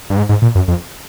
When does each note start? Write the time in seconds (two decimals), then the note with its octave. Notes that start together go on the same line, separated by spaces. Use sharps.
0.10 G2
0.17 G#2
0.29 G#2
0.42 A#2
0.55 F#2
0.68 F2